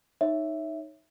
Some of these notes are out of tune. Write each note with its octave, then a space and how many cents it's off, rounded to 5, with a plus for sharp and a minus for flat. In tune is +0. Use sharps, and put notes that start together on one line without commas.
D#4 +0 C#5 +0 E5 +0